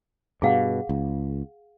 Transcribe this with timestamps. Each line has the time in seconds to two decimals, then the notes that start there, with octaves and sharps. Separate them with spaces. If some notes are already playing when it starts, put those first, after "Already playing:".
0.42 G2 B2 G#4 F5 F#5
0.89 C#2